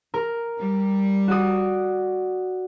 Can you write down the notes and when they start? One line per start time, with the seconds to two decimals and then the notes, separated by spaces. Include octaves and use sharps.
0.14 A#4
0.59 G3
1.28 F#4 D5 D#6